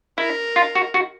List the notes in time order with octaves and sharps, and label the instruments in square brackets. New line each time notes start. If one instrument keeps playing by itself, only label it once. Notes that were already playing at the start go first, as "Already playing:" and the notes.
[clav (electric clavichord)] E4 [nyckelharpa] A#4
[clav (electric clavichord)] F4
F#4
F#4